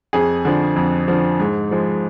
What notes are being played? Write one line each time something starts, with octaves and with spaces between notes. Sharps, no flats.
F2 G#4
D3 F3
F2
D3 F3
G#2
F3 G#3